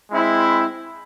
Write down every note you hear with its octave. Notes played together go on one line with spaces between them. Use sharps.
G#3 C4 E4